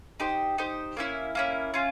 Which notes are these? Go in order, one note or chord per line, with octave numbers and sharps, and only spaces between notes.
D#4 G4 C5
D#4 G4 C5
A#3 C#4 E4
A#3 C#4 E4
C#4 F4